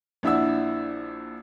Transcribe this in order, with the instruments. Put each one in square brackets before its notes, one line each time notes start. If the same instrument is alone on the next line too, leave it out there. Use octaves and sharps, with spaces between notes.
[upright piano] A#1 D4 E4 E5 F#5 E6